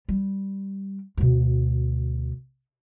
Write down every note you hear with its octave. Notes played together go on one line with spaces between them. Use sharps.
G3
D2 B2